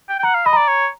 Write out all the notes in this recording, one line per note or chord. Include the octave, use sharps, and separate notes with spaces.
G5
G5
F#5 A#5
F5
D#5 B5
D5 A#5
C#5